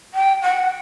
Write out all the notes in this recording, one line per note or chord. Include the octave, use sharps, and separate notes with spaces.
G5
F#5